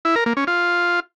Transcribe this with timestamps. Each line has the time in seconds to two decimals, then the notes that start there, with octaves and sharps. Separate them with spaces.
0.05 E4
0.15 A#4
0.26 A#3
0.37 C#4
0.47 F4